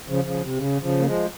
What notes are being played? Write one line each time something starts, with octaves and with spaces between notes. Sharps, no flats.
C#3 F3
C#3 F3
C3
C#3
C#3 F3
A#3
F3 G#3